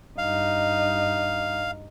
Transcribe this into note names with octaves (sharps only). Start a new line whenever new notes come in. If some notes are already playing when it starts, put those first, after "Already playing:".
G2 D#4 F5